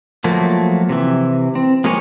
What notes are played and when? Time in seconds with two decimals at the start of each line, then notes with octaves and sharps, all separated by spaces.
0.24 F3 F#3 A3 A#3
0.89 C3 E3
1.55 C4
1.84 F3 G#3 A#3 G4 C#5 G#5